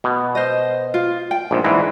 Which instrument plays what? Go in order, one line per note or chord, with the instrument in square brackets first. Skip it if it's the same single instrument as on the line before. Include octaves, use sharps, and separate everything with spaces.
[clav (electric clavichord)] B2
[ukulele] C5 D#5
F4
G5
[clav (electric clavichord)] A#1 G#2
[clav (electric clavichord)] G#2 E3 [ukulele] D4